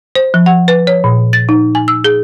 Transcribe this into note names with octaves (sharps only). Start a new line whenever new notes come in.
C5
F3
F#5
B4
C#5
A#2
A6
D#4
G#5
E6
G#4